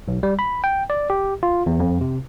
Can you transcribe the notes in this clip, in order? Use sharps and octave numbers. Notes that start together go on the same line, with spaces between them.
B1
G3
B5
G5
D5
G4
F4
E2
F2
C3